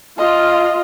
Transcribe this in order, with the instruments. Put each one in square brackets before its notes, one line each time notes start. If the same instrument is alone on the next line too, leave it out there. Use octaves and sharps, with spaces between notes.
[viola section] F4 [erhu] D#5